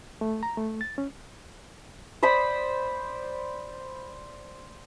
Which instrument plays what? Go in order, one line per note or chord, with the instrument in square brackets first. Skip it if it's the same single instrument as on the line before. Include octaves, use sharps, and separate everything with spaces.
[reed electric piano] A3
A#5
A3
A6
C#4
[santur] C5 D5 B5 D#6